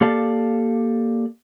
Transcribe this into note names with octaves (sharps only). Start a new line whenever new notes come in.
A#3 G4 A4 D5 F5 A5